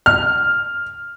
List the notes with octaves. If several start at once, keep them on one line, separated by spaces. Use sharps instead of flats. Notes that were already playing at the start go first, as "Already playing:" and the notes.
F6